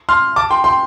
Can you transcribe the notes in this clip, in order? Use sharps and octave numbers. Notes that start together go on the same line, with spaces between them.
C6 F6
A5 D6
G5 C6
G5 C6